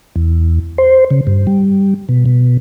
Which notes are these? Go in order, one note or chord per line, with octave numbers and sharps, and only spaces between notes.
E2
C5
C#3
G2
G3
B2
B2